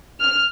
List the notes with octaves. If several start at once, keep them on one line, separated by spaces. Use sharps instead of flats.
F6